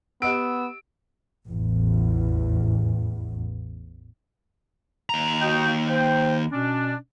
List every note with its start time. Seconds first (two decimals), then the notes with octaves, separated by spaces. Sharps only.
0.22 B3 G4 D#5 F#5 E6 D7
1.48 A1 E2
5.10 D#2 A#5
5.41 F#4 D#5 G5
5.89 C5 G5
6.51 B2 C#4 D4